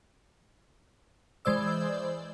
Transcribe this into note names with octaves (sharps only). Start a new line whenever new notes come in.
E3 G#3 C5 D5 E6